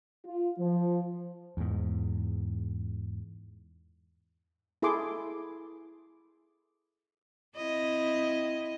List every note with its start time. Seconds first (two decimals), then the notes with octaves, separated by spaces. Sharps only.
0.25 F4
0.59 F3
1.57 E2 G#2
4.82 E4 G#4 A4 C6 D6
7.56 C4 E4 D#5